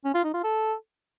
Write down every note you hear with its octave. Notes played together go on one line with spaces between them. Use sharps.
C#4
F4
D#4
F4
A4